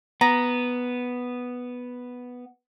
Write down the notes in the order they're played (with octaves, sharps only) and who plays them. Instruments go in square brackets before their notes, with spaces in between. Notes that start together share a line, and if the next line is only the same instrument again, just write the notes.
[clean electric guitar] B3 [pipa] A#5